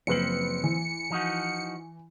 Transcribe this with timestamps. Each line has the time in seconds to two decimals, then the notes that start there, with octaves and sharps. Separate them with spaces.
0.07 F#1 F3 C4 B4 C#7 F#7
0.64 E3
1.10 F3 D#4 F#4